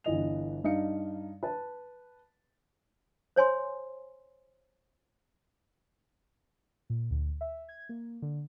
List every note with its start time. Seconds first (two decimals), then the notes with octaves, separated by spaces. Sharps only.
0.04 G1 E3 D#5 F7
0.64 G2 D#4 F5 C#7
1.43 B4 A5
3.36 C5 C#5 G#5 C6
6.90 A#2
7.11 D2
7.41 E5
7.69 G#6
7.89 A#3
8.22 D3